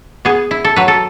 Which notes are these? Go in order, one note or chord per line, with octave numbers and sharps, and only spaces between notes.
B3 G#4
E4
A4
F#3 B4
A4